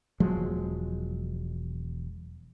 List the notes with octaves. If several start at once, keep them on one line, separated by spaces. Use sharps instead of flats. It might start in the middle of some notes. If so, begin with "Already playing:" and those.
E1 F3 F#3 G#3